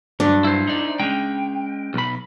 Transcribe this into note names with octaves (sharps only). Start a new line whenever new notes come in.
G2 F#3 D4
E4 C5
D#4 D5
G#3 C#4 G5
B1 B5